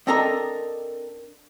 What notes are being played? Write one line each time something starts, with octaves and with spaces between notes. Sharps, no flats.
C4 D4 A4 A#4 D#5 A#5